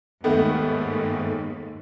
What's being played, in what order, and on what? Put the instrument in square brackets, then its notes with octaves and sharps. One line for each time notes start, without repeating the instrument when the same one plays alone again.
[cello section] D#2 G#2 [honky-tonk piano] D#3 A3 B3